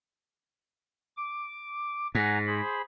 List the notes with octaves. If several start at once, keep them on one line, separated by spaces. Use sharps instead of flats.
D6
G#2 F#5 G#5 A#5
G#4 C5 B5